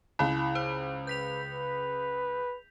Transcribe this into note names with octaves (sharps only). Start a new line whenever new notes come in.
C#2 E4 B5
C5
B4 G6 B6 F7
B4